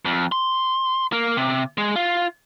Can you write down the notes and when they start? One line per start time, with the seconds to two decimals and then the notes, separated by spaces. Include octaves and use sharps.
0.05 F2
0.32 C6
1.12 A#3
1.37 C3
1.78 G#3
1.96 F4